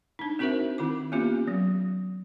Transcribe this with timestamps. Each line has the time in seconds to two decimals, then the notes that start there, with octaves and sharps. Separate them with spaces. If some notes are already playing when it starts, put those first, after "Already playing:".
0.19 D4 D#4
0.39 C4 D#4 F#4 A#4 C5 E5
0.78 D#3 C4 E4 D6
1.12 A#3 B3 C#4 F4 G4
1.48 F#3